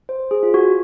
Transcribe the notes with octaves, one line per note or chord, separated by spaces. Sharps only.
C5
G#4
F4
F#4